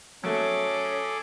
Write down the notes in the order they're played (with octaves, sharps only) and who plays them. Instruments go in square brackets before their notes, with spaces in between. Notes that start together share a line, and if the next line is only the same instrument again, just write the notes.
[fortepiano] F#3 A3 [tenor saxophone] C#4 [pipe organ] G#4 A4 D6